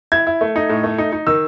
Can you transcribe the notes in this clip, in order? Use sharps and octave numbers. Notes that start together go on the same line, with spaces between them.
E4 G#6
E4
A3
D#4
A2
A3
D#4
D#4
D#3 E6